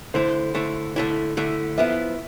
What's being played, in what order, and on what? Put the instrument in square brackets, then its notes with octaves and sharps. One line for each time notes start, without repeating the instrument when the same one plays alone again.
[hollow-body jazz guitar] D3 A3 E4 [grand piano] C5
[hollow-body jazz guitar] D3 A3 E4
D3 A3 E4
D3 A3 E4
[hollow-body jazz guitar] F3 B3 E4 [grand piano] E5